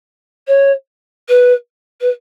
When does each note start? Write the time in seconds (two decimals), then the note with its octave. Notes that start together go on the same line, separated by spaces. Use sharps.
0.48 C#5
1.29 B4
2.01 B4